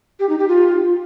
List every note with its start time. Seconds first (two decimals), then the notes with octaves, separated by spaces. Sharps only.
0.20 G4
0.29 D#4
0.39 G4
0.48 F4